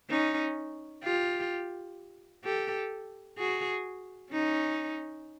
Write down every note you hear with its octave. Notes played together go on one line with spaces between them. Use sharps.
C#4 D#4
F4 G4
G4 A4
F#4 G#4
C#4 D#4